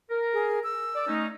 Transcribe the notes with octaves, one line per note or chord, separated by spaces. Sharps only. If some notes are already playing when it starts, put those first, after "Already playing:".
A#4
G#4
E6
D5
A3 C#4 D#4